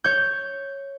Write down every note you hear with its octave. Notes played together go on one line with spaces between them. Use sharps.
C#5 G6